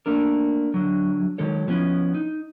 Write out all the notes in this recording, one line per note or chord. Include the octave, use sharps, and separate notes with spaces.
A3 A#3 D4 A#4
D3 F#3
D#3 F#3 G#3 A4 C#5
F3 B3 C#4 E4
D#4